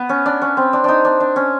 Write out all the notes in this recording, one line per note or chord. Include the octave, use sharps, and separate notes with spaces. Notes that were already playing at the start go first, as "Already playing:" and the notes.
Already playing: B3
C#4
D4
C#4
C4
D4
D4 D#4
D4
D4
C#4